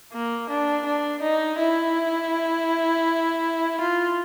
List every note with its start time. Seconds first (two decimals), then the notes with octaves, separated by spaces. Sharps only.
0.13 A#3
0.50 D4
0.86 D4
1.22 D#4
1.59 E4
3.81 F4